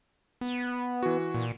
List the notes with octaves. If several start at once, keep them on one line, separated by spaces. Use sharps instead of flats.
B3
E3 F#4
A#2